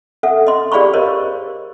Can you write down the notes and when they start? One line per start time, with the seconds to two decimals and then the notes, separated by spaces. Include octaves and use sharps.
0.23 A4 E5 F#5
0.47 D#5 C6
0.72 G4 G#4 D5 F5 B5 C#6
0.93 A#4 C5 C#5 D#5